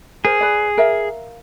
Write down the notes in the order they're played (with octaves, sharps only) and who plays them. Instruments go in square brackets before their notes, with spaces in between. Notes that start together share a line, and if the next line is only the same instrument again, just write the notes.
[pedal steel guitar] G#4 [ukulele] A#4 C5
[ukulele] B4 D5
A#4 E5 F5